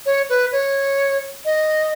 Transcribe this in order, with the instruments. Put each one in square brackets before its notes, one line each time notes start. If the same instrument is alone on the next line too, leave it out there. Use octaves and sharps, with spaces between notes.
[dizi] C#5
B4
C#5
D#5